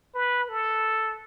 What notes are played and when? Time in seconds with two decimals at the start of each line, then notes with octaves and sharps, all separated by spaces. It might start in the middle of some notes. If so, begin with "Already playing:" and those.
0.14 B4
0.49 A4